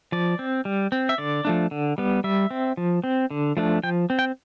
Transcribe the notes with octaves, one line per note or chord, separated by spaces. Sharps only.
F3 D5
C4
G3
C4
E5
D3 D5
F3 A3 D4
D3
G3 B3
G3 E5
C4
F3
C4
D3
F3 A3 D4
F3 G5
C4
G5